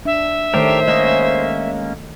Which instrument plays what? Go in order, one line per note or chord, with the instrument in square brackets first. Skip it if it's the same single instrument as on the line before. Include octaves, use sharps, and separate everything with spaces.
[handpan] D4 [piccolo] E5
[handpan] D#3 A3 C#5 [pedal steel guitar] D4 G4 A#4 [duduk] C5
[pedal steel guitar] G#3 A#3 C#4 [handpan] D#5